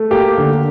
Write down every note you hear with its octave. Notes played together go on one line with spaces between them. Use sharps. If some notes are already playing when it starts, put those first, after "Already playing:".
Already playing: A3
A#3 G4
D3